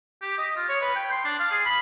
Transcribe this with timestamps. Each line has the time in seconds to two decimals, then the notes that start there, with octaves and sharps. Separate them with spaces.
0.22 G4
0.38 D#5
0.57 F4
0.69 C#5
0.81 B4
0.96 G5
1.11 C6
1.25 D4
1.39 F5
1.51 G#4
1.65 B5